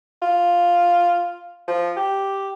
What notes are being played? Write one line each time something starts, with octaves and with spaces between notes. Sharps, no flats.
F4
F3
G4